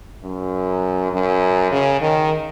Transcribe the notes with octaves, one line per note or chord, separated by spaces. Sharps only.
F#2
F#2
C#3
D#3